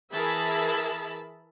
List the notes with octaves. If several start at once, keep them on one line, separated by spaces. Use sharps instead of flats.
E3 G#4 A#4 E5 A5 B5